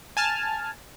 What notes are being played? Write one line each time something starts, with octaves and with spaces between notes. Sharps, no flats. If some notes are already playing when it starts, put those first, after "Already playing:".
G#5 A5 F6